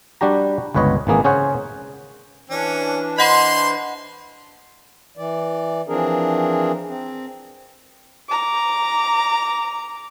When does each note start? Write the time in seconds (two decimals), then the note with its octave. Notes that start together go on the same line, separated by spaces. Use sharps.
0.21 G3 D4 F#4 G4 A#5
0.74 G1 C#2 B4 C#5 D#5
1.07 G#1 E3 A#3 G#4
1.24 C#3 C#4 G#4 C5 C#5 F#5
2.50 E3 C#4 D4
3.18 C5 D#5 F#5 B5 C6
5.17 E3 D5
5.88 E3 F3 C4 D4 G#4 A#4
6.88 C4
8.29 A#5 D6